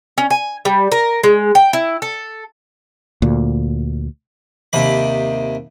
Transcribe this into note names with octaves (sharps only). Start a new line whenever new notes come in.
C#4
G#5
G3
A#4
G#3
G5
E4
A4
D2 A#2
D#2 C3 B5